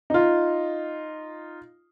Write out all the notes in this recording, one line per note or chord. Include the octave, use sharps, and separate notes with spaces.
D#4 F4